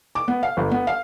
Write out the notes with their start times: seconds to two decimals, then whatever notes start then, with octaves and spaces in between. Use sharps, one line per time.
0.15 D6
0.28 B3
0.43 F5
0.57 G1
0.71 B3
0.87 F5